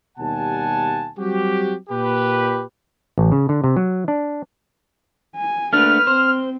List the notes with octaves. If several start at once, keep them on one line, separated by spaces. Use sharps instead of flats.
D#2 B2 G3 F#5 G#5 A5
F#3 G3 C4 F#4 G4
A#2 G4 B4
A1
C#3
D3
C3
F#3
D4
G#5
A3 A#3 D4 B4 F6
C4 C5